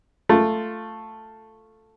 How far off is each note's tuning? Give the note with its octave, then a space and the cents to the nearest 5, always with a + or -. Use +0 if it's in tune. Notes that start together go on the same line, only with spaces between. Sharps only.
A3 +5 F4 +0